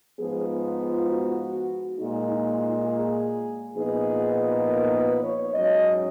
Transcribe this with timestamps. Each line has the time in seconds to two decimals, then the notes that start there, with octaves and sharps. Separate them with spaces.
0.19 G#2 F3 B3 G#4
0.79 F4
1.08 F#4
1.97 A#2 G#3 D#4
2.27 D#4
2.57 F4
2.86 G#4
3.75 A#2 F3 B3 D#4 G#4
4.64 A#4
4.94 B4
5.23 C#5
5.53 G#2 F#3 C#4 D#5